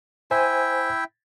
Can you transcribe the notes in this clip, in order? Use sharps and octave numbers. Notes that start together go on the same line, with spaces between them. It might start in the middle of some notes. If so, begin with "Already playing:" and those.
E4 C5 E5 G5 G#5